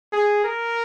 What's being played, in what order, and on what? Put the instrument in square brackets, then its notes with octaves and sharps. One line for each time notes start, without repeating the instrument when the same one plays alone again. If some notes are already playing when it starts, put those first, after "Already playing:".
[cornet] G#4
A#4